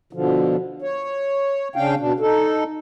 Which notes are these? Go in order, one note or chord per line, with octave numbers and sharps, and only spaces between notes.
B2 D3 F3
C#5
C#3 C#4 D4 F5 G5
B2 D4
D#4 A4